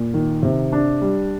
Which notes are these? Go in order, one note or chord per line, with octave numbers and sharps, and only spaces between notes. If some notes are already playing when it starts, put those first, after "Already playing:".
Already playing: A#2
D#3
C3
D4
G3